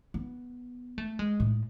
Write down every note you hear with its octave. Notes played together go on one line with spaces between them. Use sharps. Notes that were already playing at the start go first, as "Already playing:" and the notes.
B3
A3
G#3
A2